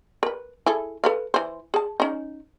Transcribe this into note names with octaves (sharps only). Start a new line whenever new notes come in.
A#4 B4
E4 G#4 A4
A4 B4 F5
E3 C5
G#4 A5
C#4 D#4